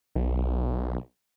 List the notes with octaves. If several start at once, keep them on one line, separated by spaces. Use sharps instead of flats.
B1